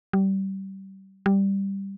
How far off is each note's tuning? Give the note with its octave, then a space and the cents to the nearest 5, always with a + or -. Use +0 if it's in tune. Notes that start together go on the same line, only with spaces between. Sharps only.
G3 -25
G3 +0